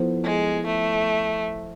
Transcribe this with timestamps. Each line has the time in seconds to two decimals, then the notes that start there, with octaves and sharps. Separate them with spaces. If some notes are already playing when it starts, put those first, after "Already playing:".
Already playing: F3 B3 E4 A4 C5
0.24 G#3
0.66 A3